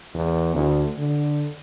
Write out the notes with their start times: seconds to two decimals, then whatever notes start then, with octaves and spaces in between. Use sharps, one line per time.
0.14 E2
0.55 D2
0.98 D3